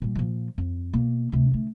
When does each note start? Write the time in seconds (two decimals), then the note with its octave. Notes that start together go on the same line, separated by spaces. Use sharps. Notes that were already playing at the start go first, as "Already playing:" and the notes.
0.02 A#2 G3
0.15 A#2 F3
0.58 F2
0.93 B2 A#3
1.32 D2 C3
1.51 D3 A3